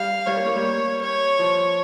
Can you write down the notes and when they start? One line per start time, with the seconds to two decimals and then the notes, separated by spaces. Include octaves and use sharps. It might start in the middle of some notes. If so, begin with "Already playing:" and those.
Already playing: G3 F5
0.27 G3 C#5
0.36 A#3
0.46 A#3
0.56 G3
1.01 C#5
1.39 F3